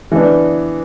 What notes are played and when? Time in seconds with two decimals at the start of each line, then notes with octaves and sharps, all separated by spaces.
0.12 E3 B3 D4